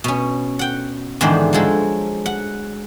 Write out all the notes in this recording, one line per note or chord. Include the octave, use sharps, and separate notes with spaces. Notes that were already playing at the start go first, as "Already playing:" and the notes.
B2 C#4
F#5 G5
E2 G#2 D3 D#3 D4 C5
F3 F#3 G#3 A4
F#5